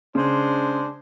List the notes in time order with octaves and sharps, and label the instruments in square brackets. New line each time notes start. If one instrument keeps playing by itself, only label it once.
[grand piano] C#3 [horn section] G#3 D4 C5